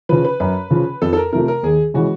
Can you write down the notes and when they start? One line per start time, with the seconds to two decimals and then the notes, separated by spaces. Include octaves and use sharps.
0.09 C#3 F3 B4
0.24 B4
0.40 F#2 B4
0.70 C#3 F3
1.02 F2 A4
1.13 A4
1.17 A#4
1.33 C3 F3 A3 A#4
1.48 A#4
1.63 D#2 G#4
1.94 C#3 E3 G#3 C#4 F#4